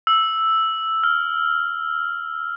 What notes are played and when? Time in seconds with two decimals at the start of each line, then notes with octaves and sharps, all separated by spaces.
0.07 E6
1.04 F6